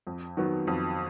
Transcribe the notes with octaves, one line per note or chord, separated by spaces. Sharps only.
F2
D#3 F#3 B3
F2